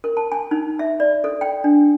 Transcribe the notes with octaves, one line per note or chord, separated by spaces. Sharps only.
A#4
A5
G#5
D#4
E5
D5
A4
G5
D4